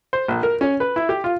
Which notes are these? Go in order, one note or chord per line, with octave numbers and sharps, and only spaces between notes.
C5
A#1
A#4
C#4
B4
E4
G4
F4